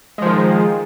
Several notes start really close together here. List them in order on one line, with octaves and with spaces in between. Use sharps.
G#3 F3 D#3